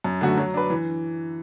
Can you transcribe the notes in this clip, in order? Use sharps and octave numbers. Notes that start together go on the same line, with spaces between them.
F#2
D3 A3 F#4
F#3
D4 B4
E3